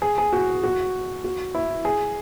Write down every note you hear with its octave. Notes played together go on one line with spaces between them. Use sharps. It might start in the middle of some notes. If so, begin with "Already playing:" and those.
G#4
G#4
F#4
F#4
F#4
E4
G#4